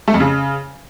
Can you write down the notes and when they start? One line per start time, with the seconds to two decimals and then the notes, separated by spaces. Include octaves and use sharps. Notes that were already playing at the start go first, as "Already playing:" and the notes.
0.08 A3
0.14 F2
0.20 C#3